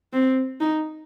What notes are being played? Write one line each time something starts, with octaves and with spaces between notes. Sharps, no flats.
C4
D#4